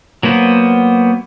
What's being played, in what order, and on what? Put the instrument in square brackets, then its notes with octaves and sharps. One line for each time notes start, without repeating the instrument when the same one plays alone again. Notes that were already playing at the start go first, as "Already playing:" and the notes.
[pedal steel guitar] F#3 A#3 B3 C5